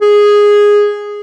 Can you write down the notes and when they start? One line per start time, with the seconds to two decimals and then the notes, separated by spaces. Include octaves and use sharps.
0.01 G#4